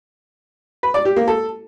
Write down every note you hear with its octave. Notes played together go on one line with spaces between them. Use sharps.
B4
D5
G4
A#3
A4